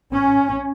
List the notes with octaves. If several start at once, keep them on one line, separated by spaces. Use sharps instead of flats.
C#4